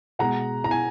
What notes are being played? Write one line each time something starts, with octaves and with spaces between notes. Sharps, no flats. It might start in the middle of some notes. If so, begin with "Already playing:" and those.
B2 G#3 F#5 A#5
A#5
G#5